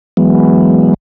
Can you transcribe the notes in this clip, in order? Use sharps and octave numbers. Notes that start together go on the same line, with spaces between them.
E3 F#3 G#3 B3